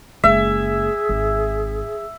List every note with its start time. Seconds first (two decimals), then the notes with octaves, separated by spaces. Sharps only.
0.24 F#1 G#3 G#4 E5
1.09 G#1